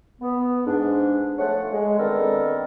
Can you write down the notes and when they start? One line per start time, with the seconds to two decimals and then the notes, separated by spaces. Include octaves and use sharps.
0.22 B3
0.66 G#2 D4
1.39 F3 A3 C#5 F#5
1.71 G#3
1.99 D3 D#3 B3 C4 A4 A#4